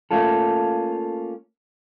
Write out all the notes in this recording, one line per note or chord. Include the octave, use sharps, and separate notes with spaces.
A3 A#3 C#4 F4 A4